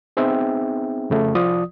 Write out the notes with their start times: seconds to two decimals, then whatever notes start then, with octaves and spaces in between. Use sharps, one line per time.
0.17 B3 C4 D#4 G#4 E5 G5
1.10 F2 C#3 A3
1.35 C2 F3 F4 D5 D#6